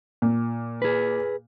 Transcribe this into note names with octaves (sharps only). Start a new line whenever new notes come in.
A#2
G#4 B4